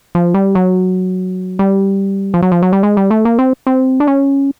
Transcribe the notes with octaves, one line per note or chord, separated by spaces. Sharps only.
F3
G3
F#3
G3
F3
F#3
F3
F#3
G3
G#3
G3
A3
A#3
C4
C4
D4
C#4